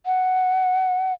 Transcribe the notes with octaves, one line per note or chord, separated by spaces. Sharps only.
F#5